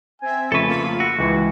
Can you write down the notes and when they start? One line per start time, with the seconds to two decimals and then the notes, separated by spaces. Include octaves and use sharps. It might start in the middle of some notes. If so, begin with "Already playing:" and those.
0.22 C4 E5 G#5
0.52 F2 C#3 A3 A4 B4 C#6
0.66 A#3 F4 B5
1.00 F#4 E6
1.18 C#2 E3 G#3 C#6